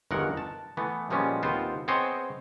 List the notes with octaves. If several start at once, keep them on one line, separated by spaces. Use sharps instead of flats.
G1 E2 D#3 G#3 A#4 F#5
A5
E3 A3 B3
A#2 F3 G3 G#3 B3 C#4
D#2 B3 C4 F4 C5
B3 C4 G#4 C5 C#5 D#5